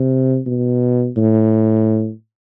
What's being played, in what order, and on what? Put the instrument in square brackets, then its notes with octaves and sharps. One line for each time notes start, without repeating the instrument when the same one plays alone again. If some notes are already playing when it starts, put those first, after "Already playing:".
Already playing: [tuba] C3
B2
A2